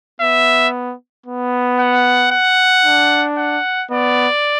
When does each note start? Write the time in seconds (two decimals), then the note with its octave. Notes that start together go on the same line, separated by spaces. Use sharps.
0.21 B3 E5
1.26 B3
1.80 F#5
2.31 F#5
2.85 D4
3.38 F#5
3.90 B3 D5